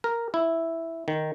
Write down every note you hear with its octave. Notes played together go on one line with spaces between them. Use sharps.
A#4
E4
D#3